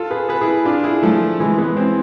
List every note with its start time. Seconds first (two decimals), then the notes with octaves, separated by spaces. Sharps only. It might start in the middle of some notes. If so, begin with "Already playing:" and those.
Already playing: F4 A4
0.10 G#4 B4
0.29 G#4 B4
0.41 E4 G#4
0.65 D4 F4
0.84 E4 G#4
1.03 F3 A3
1.40 E3 G#3
1.58 G#3 B3
1.76 C4 E4